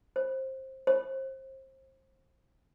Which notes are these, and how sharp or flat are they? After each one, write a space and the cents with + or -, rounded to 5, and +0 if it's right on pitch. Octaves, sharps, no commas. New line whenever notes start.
C5 +20
C5 +30